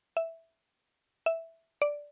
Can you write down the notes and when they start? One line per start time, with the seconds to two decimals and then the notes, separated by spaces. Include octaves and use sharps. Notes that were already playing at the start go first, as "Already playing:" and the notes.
0.17 E5
1.26 E5
1.82 D5